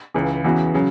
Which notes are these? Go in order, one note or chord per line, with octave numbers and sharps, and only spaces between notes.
C#2 C#3 E3
E2 C#3 E3 B3 F#4
C#3 F#3